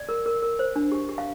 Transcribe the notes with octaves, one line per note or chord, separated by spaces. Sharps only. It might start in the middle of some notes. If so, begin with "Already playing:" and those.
Already playing: D5
A#4
A#4
A#4
C5
D4
G4
G4
F5